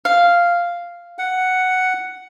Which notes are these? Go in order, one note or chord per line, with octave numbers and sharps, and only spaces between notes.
F5
F#5